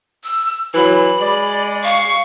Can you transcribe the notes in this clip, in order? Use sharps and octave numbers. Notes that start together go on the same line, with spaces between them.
E6
E3 F#3 B5
G#3 D5
F5 C#6